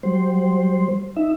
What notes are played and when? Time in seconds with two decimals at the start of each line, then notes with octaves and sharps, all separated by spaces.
0.03 F#3 G3 C5
1.16 D#4 E5